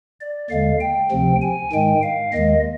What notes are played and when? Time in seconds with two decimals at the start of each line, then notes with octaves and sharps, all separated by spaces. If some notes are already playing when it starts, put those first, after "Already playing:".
0.20 D5
0.50 D#2 D3 G#3 F5
0.80 G5
1.11 D2 C3 F3 C4
1.41 G#5
1.73 G#2 D#3 G#3 G5
2.03 F5
2.33 D#2 D#3 G#3 D#5